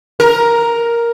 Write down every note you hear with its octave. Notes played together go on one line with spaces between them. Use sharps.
A#4